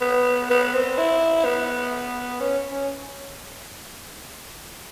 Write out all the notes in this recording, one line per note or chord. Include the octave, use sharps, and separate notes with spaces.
B3
B3
C4
E4
B3
C#4
C#4